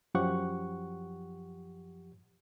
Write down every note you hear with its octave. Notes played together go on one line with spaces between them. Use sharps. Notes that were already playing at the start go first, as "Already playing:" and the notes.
F#2 F3 G4 F#5 C#6